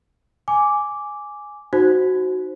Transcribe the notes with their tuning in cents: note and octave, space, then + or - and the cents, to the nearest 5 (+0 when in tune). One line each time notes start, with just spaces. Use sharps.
G#5 +0 D6 -5
D#4 +0 F#4 +0 C5 +0